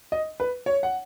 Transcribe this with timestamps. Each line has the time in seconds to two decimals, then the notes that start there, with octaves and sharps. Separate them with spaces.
0.12 D#5
0.40 B4
0.66 C#5
0.83 F#5